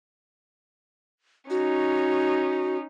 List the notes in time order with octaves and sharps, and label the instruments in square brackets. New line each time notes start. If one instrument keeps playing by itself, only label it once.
[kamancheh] C#4 D#4 [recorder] F#4